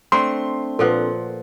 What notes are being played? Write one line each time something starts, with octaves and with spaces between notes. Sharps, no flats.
A3 C4 D4 C6
A#2 F3 A4 B4 F#5